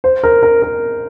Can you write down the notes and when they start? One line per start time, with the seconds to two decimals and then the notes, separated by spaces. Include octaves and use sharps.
0.04 C5
0.23 A#4
0.43 A#4
0.62 A#4